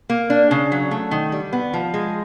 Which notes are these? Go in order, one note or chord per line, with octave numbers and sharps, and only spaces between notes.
A#3
D4
C#3
F#3
A3
D#3
G3
B3
F3
G#3